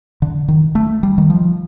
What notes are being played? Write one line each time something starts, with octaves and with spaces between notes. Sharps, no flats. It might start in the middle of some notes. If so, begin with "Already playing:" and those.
D3
D#3
A3
G3
D#3
F3